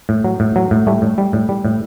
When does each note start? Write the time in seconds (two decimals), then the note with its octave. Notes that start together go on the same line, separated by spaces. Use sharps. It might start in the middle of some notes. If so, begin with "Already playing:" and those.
0.09 A2
0.24 F#3
0.40 A2
0.56 F#3
0.71 A2
0.87 G3 A3
1.02 A2
1.18 G3
1.33 A2
1.49 G3
1.65 A2